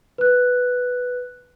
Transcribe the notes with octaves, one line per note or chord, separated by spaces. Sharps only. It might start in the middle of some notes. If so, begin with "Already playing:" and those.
B4 F#6